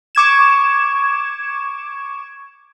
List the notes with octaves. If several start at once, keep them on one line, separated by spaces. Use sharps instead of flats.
C#6 D6 G#6 E7